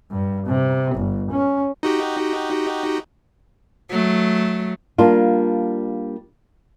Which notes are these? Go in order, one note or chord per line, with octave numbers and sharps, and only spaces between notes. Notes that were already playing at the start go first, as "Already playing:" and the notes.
G2
C3
G1
C#4
D#4 F#4 G4
F#3 A3
G3 A#3 D4 F4